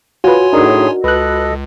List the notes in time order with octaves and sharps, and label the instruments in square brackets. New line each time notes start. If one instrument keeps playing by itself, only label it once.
[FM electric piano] F4 B4 [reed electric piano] F#4 [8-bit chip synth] C#5 G#5 C6
[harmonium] A2 G#4 [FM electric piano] D4 D#4 A#4
[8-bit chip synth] C#2 [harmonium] A4 D#5 [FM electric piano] B4 F#6